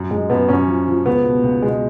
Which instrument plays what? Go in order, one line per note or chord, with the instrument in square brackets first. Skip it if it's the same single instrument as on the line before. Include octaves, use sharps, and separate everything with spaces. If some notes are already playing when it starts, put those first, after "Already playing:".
Already playing: [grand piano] F#2
[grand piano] F#2 [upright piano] G#3
[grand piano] F#2 [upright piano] B3
[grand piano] F#2 [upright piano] C#4
[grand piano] F3
F3
[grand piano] C#2 [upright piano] B3
[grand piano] B2
C#2
[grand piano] B2 [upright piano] G#3